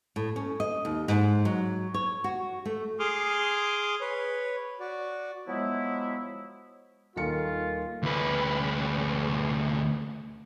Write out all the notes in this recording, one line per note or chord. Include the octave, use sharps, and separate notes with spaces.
A2
C#4
D#5
D#2
G#2
F#3
C#5
F#4
A3
G#4 C6 D6 D#6 F6
B4 C#5
F#4 D5
F3 F#3 G#3 B3 E4
D#1 D#3 F4 A4 A#4 C#7
D2 B4